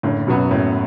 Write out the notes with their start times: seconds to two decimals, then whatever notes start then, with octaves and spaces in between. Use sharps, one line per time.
0.03 F#1 A2 D3
0.27 F#2 B2 F#3 B3 F#4
0.50 F#1 A2